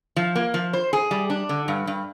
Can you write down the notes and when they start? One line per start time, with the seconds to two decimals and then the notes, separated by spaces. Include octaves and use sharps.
0.16 F3
0.36 A#3
0.54 F3
0.73 C5
0.93 G#4
1.11 G3
1.30 D4
1.49 D3
1.68 G2
1.87 G2